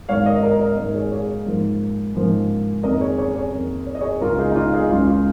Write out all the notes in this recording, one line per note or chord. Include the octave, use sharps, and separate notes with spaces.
G#2 D#3 G#3 C#5 F5
A#4 D#5
A#4 D#5
A#4 D#5
G#2 D#3 G#3 A#4 D#5
G#4 C#5
G#4 C#5
G#2 F3 A#3
G#2 F3 A#3
F2 D#3 A#3 A#4 D#5
G#4 C#5
G#4 C#5
G#4 C#5
F2 D#3 A#3
C#5
D#5
G#4 C#5
C#2 C#3 G#3 F4 A#4
D#4 G#4
D#4
F4
D#4 G#4
C#2 C#3 G#3 F4
F4